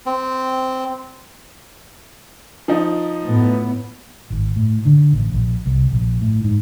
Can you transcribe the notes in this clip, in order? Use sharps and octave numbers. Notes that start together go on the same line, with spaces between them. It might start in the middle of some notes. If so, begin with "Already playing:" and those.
C4
F3 D#4
A2 B3
G#1
A2
D3
A1
A#1
C2
A#1
A2
G#2